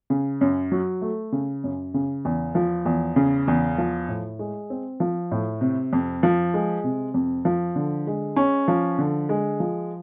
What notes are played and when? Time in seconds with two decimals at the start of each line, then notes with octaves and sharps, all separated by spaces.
0.10 C#3
0.41 F#2
0.72 F#3
1.02 A3
1.32 C#3
1.64 F#2
1.94 C#3
2.25 E2
2.55 F3
2.85 E2
3.16 C#3
3.48 E2
3.78 F3
4.09 A2
4.39 G#3
4.70 C4
5.00 F3
5.31 A2
5.61 C3
5.93 F2
6.23 F3
6.54 G#3
6.84 C3
7.14 F2
7.45 F3
7.76 D3
8.07 G#3
8.36 C#4
8.68 F3
8.98 D3
9.29 G#3
9.60 F3